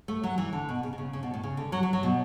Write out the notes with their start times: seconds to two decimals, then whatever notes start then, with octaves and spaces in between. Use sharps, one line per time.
0.08 A3
0.24 F#3
0.38 E3
0.53 D3
0.69 B2
0.83 C#3
0.93 B2
0.98 C#3
1.13 C#3
1.23 B2
1.34 A2
1.44 C#3
1.57 D3
1.72 F#3
1.83 F#3
1.93 F#3
2.03 B2